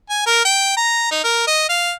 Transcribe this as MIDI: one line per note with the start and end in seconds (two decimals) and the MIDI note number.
0.10 0.26 80
0.26 0.43 70
0.45 0.74 79
0.77 1.07 82
1.11 1.19 63
1.24 1.44 70
1.47 1.67 75
1.69 1.92 77